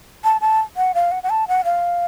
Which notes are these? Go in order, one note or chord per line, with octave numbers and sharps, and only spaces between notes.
A5
A5
F#5
F5
F#5
F#5
A5
F#5
F5